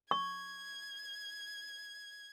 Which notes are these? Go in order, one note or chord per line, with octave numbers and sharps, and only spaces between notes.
C#6 G#6